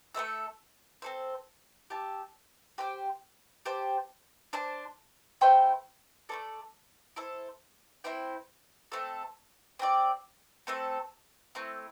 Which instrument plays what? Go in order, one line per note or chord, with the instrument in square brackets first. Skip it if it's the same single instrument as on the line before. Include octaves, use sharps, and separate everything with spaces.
[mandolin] A3 C4 A4 E5
C4 A4 C5
G4 E5 A5
G4 C5 G5
G4 C5 A5
D4 C5 A5
A3 E4 C5 G5
A3 C4 A4 D5
E4 A4 C5
C4 E4 C5 G5
A3 C4 A4
C4 G4 D5
A3 C4 A4
A3 C4 E4